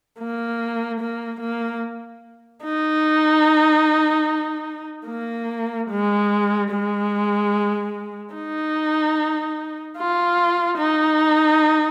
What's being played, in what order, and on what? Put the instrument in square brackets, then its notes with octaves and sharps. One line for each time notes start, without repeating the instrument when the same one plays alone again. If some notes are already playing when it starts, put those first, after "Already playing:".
[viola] A#3
A#3
A#3
D#4
A#3
G#3
G#3
D#4
F4
D#4